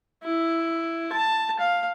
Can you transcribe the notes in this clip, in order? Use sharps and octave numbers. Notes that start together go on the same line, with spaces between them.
E4
A5
F5